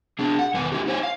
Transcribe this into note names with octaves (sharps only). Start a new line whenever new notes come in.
B3 D4 G#4
F#5
E2 B2 D#3 B4 G#5
A#3 E4 F4 G4
D#4 E4 C5 C#5 G#5
F5